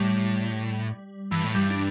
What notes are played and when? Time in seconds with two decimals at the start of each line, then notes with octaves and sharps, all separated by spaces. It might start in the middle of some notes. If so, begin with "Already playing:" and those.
Already playing: A2 G3
1.31 G2 E3
1.44 A2
1.55 G2 G3
1.70 D4